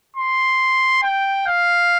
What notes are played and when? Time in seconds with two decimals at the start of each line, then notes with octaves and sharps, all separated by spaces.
0.16 C6
1.03 G5
1.46 F5